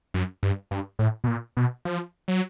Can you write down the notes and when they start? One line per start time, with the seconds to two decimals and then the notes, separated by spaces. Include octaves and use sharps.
0.14 F#2
0.43 G2
0.71 G2
0.99 A2
1.24 B2
1.28 A#2
1.57 B2
1.85 F3
2.28 F#3